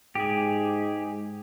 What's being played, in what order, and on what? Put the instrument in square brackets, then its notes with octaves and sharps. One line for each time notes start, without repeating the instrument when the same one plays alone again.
[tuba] G#2 [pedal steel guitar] G4 G#4